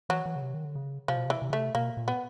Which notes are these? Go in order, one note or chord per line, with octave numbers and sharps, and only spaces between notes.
E3 F#3
E3
C#3
C3
D#3
D3
C#3
C3 F3
B2
C3
E3
C3
C#3 A3
C3
B2 A#3
A#2
B3